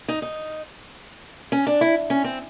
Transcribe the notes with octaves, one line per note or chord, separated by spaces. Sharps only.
D#4
D#4
C#4
D4
E4
C#4
C4